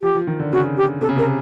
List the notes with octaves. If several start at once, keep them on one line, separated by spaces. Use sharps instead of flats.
F3 G4
F3
D#3
D3
C#3 F#4
G4
C3 A4
C#3
C3 A#4